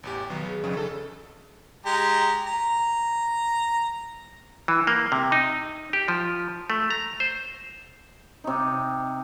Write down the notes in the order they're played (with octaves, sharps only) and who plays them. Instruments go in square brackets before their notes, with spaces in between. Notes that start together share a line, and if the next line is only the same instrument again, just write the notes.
[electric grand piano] A1 E2 G4
[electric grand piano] B1 F#3 B3 [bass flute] D#3
[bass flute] G#4
[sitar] F2 [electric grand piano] C#3
[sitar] A4
[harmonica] G#3 G4 A#5
A#5
[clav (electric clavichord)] E3
A#3
C3
D#4
G4
F3
A3
A#5
C5
[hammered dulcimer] C3 D#4